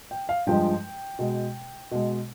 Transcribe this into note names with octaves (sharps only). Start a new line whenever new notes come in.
G5
F5
G2 F3 G#3 G5
B2 G#3
B2 G#3